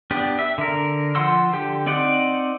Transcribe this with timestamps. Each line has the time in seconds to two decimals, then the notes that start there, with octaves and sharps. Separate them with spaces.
0.11 B3 D4 G4
0.39 E5
0.58 D3 A#4
1.15 F3 C5 F#5 C6 E6
1.53 D3 G4
1.86 C4 D#4 D5 F#5